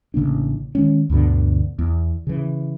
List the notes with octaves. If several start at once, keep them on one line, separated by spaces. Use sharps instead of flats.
A1 C#3 A#3 D4
D#3 G#3 C#4
D2 G2 B2 D3
E2
C#3 E3